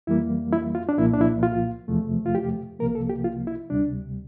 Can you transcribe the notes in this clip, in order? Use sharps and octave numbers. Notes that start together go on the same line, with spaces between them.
F2 E3 G3 A#3 E4
E4
F4
D4
C2 A#2 F3 A#3 E4
D4
E4
F4
E2 C3 F3 A3
F4
G4
C2 C3 F3 A#3 A#4
A4
G4
F4
E4
D2 C3 G3 D4